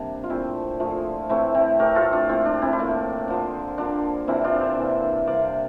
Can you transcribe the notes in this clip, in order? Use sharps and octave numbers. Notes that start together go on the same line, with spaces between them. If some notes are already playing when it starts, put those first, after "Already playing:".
Already playing: C3 G3 A#3 D4
F4
A#2 F3 A3 C4 E4
A#2 F3 A3
A2 E3 A3 C4 E4
C4 E4
A2 E3 A3 G4 A#4
F4 A4
D4 F4
A2 F3 A#3 C4
D4
C4 E4
E4
A2 F3 A#3 D4
D3 F3 A#3
D3 F3 A#3 D4
C3 E3 A#3 C4 E4
D4 F4
F5
C5 E5
C3 E3 A#3
C3 G3 A#3 D5 F5